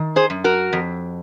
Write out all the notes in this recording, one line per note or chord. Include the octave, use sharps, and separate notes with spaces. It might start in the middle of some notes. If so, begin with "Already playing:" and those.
Already playing: D#3
G#4 C5
F#2
F#4 A#4
F2